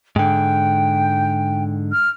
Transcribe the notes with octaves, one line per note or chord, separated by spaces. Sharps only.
G#2 D3 G5
F6